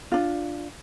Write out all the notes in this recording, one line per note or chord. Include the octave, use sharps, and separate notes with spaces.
D4 F4